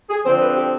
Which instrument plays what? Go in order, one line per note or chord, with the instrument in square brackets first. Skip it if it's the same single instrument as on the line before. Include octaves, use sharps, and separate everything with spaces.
[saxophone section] G#4
D3 F3 C4 C5
B4
G4